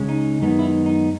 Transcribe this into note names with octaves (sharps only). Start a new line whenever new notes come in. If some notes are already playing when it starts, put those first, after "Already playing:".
Already playing: C#2 C#3 G#3 C#4
D#4
F#2 D#3 G#3 B3 D#4
E4
D#4
D#4